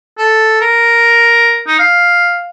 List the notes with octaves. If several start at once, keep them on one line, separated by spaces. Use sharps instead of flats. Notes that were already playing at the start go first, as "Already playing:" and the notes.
A4
A#4
D#4
F5